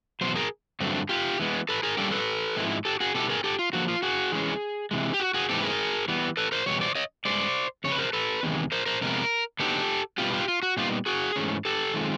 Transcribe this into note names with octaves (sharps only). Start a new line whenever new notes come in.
E2 B2 F#3 C5
G#4 A#4
G2 D3 F#3 A3 C4
F4 G4
E3 G#3 B3
A4 B4
G#4 A#4
D3 G3 A#3 C#4 G4 A4
A4 B4
G#2 F3 G#3 C4 E4
G4 A4
F#4 G#4
B2 G3 B3 E4 G4 A4
G#4 A#4
G4 A4
F4
D3 F3 A#3 F#4
F4
F#4 G#4
E3 G#3 C#4
C3 E3 G#3
G4
F#4
F#4 G#4
G#2 E3 A3 C4 G4 A4
B4
G#4 A#4
E3 G3 B3
A4 B4
A#4 C5
E2 B2 G3 C#5
C5 D5
C#5 D#5
G2 E3 G#3 C5 D5
F2 C#3 C#5
B4
A#4 C5
A4 B4
E2 C3 D#3 G#3
A#4 C5
A#4 C5
F2 C3 G#3 B3 A#4
D3 F#3 B3 D#4 G4 A4
B2 G3 B3 F4 G4
F4 G4
F4
F#4
A#2 G3 B3 D#4 F4 G4
F#4 G#4
G#2 E3 A3 C#4
G4 A4
D#3 G#3 C4 F4